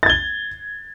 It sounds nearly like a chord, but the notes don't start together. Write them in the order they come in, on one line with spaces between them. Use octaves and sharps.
A6 G#6 G7